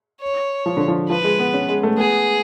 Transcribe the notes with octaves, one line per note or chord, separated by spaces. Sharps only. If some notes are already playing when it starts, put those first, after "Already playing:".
C#5
F3
D3
F3
F3 B4
G#3
B3
C#4
G#3
A3
B3 G#4